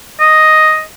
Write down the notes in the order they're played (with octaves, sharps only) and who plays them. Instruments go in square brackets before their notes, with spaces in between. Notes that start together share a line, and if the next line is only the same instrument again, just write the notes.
[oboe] D#5